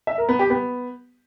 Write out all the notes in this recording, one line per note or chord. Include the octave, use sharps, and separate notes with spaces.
E5
A#4
B3
G4
B3